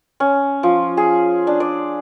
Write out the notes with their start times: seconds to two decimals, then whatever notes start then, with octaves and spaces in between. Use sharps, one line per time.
0.20 C#4
0.63 F3
0.97 G#4
1.47 D4
1.60 D5